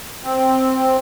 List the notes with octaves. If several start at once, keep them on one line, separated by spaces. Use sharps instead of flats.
C4